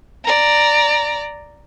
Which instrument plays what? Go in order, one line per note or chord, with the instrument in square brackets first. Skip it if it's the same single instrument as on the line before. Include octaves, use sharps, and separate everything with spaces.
[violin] D5 A#5